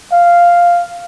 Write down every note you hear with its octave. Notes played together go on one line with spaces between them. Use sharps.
F5